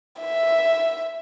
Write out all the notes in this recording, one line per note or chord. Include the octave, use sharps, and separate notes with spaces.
E5